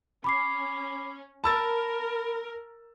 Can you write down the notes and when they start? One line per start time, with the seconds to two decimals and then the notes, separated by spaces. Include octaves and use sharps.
0.24 C#4 B5 D6 C7
1.44 A#4 A5 B5 E6 A6